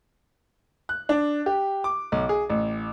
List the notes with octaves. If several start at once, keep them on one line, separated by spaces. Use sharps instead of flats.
F#6
D4
G4
D6
B1
G#4
A1